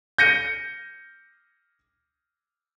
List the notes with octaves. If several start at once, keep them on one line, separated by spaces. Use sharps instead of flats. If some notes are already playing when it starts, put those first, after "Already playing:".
G6 A#6 C#7 D#7